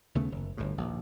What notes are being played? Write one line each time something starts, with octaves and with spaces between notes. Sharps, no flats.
D#2 C#3 A3 B3
F#1
G1 D2 A2
A#1 D#2